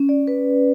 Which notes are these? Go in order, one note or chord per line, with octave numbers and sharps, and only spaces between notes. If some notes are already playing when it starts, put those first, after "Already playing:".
Already playing: C#4
D5
B4